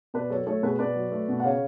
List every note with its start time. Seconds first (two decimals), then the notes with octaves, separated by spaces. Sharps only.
0.14 B2 B4 D5
0.30 F#3 A4 C#5
0.46 A3 A4 C#5
0.62 B2 G#4 B4
0.79 B2 B4 D5
0.96 F#3
1.11 A3
1.28 B2
1.40 F#5
1.44 C#3 C#5 F5